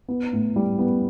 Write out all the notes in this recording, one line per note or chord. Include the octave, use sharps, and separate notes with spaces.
B3
A2
G3
B3